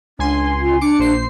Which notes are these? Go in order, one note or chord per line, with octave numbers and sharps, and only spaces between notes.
C#2 D4 G#5 C6
F4
D4 D6 C#7
A#1 C5 C7